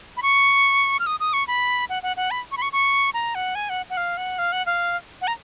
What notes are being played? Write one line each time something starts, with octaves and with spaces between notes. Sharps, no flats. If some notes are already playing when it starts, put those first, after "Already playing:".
B5
C#6
F6
D#6
D#6
C#6
B5
F#5
F#5
F#5
B5
C#6
B5
C#6
C#6
A#5
F#5
G#5
F#5
F#5
F5
F#5
F5
F#5
F5
F#5
A#5